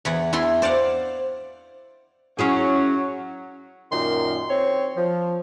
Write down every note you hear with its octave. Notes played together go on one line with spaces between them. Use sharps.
E2 E3 F#5
E2 E3 E4 C6
C5 D5 F5 F#5
F#3 C#4 E4 G#4
F#2 A#2 D#3 C6
C4 C#5
F3